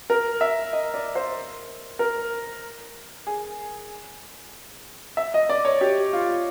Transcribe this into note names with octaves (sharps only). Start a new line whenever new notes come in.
A#4
E5
D#5
D5
C5
A#4
G#4
E5
D#5
D5
C#5
G4
F4